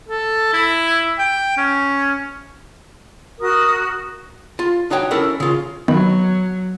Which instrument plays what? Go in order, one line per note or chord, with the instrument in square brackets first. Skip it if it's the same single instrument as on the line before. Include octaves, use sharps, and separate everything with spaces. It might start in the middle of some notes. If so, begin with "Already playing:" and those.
[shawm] A4
E4
G5
C#4
[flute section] F#4 A#4 D#6
[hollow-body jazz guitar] F4
D4 D#4 F#4 C#5 G5
C#4 E4 A4 A#4
C#3 F4
[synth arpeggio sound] D#3 [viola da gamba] F#3 [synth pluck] B3